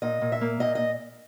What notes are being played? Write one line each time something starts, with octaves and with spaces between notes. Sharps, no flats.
A#2 D#5
A#2
E5
A#3
A#2 D#5
D#5